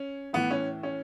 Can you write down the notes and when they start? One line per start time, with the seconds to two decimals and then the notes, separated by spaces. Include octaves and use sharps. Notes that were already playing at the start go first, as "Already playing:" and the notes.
Already playing: C#4
0.33 A2 E3 B3
0.51 C#4
0.83 C#4